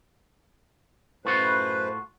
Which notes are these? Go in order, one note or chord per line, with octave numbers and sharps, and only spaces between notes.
F#2 A2 F4 F#4 B4 C5